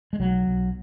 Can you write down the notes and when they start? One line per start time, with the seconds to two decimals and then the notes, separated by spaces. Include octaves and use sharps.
0.13 G#3
0.19 B1 F#3
0.47 B1